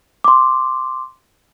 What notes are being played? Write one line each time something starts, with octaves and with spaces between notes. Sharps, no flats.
C6 D6